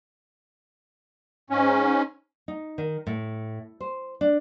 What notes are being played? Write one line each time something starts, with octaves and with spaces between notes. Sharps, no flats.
G#2 C#4
D#4
D#3
A2
C5
D4